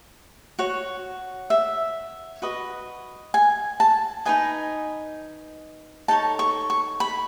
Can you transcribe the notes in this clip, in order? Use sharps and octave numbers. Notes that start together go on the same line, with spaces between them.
F#4 C#5
E5
F#4 B4 D#5
G#5
A5
D#4 G#4 B4 D#5 G#5
D#4 A4 C#5 A5
C#6
C#6
B5